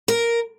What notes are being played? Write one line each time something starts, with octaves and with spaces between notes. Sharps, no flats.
A#4